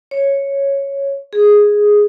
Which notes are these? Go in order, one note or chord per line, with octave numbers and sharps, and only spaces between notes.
C#5
G#4